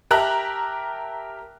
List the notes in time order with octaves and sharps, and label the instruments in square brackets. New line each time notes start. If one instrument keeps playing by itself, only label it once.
[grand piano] G4 A#4 E5 A5 A#5 F#6